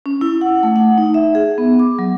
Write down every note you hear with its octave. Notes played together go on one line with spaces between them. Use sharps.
C#4
E4
F#5
A3
F#5
D#4
E5
G#4
B3
D6
F#3